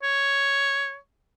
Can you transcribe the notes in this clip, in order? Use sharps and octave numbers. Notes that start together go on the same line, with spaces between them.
C#5